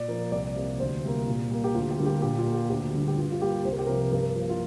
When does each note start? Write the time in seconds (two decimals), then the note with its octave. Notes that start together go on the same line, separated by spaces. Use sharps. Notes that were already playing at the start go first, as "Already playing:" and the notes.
Already playing: A#2 D5
0.08 F3 A#3
0.32 C2 D5
0.55 C3 F3 A#3
0.79 D2 C5
1.03 C3 G3 A#3
1.27 A#2
1.51 G3 A#3
1.64 G4
1.74 D2 F4
1.91 G4
1.98 D3 G3 A#3 F4
2.06 G4
2.22 A#2 G4
2.38 F4
2.46 A#3
2.54 G4
2.69 D2 G4
2.93 D3 G3
3.08 G4
3.17 G2 F4
3.32 F4
3.41 G3 A#3 G4
3.64 C2 C5
3.72 A#4
3.79 G4
3.87 C3 F3 A#4
4.12 G2 A#4
4.36 F3 A#3
4.50 F4